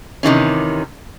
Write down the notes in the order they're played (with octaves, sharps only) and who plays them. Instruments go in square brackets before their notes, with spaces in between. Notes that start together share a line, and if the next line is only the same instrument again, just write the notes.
[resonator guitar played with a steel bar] C3 D#3 E3 C#4